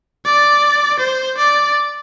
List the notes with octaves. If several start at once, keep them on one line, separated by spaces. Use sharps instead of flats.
D5
C5
D5